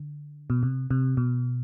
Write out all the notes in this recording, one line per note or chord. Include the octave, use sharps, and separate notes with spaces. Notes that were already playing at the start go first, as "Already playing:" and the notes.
Already playing: D3
B2
C3
C3
B2